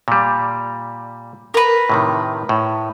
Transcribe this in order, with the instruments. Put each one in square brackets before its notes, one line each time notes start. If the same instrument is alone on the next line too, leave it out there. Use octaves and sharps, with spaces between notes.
[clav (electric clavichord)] A#2 G3
[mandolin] A#4 B4
[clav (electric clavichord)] A2 C3 D#3
A2